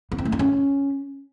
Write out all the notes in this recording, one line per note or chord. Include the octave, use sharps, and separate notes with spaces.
B3
C4
A3
D#4
C#4